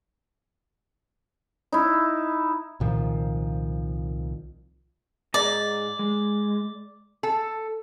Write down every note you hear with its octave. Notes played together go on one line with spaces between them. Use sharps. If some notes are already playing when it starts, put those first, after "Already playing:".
D#4 E4
C2 A#2 D#3 F3
G#2 G#4 D5 D#5
G#3
A4